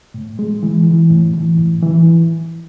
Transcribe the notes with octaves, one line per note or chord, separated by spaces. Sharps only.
A2
G#3
E3
E3
A2
E3
A2
E3